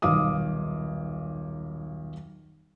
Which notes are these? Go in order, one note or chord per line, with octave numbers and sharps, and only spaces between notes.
D#1 B1 F5 D6 D#6